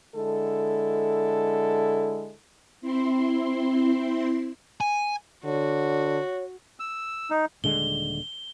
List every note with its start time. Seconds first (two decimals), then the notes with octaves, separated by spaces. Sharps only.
0.15 D3 G#3 E4 A4
2.81 C4 E4 C6
4.81 G#5
5.45 D3 F#4 C#5
6.80 E6
7.30 D#4
7.64 D#1 D3 G#3 G7